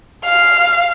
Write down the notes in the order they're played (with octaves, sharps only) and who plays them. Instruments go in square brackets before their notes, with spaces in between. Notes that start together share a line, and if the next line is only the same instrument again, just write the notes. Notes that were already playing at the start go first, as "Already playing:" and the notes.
[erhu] F5